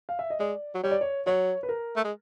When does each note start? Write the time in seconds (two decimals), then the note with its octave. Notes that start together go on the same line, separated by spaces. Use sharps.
0.09 F5
0.19 E5
0.30 D#5
0.40 G#3 D5
0.75 F#3
0.83 G3 C#5
0.91 D5
1.01 C#5
1.26 F#3 C#5
1.63 B4
1.69 A#4
1.96 A3
2.04 G#3